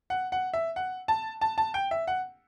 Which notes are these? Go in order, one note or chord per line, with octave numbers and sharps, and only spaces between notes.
F#5
F#5
E5
F#5
A5
A5
A5
G5
E5
F#5